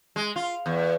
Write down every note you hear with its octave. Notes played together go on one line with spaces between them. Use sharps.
G#3
F4
E2